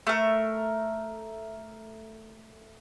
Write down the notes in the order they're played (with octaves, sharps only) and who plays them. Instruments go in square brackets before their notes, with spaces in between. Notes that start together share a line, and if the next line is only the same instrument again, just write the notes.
[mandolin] A3 A#4